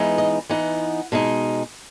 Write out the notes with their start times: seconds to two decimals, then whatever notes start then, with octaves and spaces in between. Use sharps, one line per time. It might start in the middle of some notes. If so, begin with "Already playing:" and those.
Already playing: E3 G#3 B3 D#4
0.18 D#5
0.49 E3 B3 D#4 F#5
1.12 B2 G#3 D#4